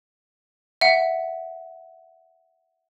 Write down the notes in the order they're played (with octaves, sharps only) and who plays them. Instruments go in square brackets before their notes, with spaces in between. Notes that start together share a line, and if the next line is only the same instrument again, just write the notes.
[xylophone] E5 F#5